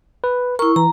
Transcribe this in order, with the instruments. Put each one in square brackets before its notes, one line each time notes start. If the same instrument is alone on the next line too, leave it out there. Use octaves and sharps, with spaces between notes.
[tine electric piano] B4
[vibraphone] E4 C#6 [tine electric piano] A#4
[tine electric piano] E3 [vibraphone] A#5